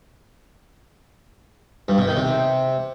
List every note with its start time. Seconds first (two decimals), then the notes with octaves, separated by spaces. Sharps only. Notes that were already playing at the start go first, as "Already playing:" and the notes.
1.88 G2
1.98 B2
2.07 D#3
2.17 C3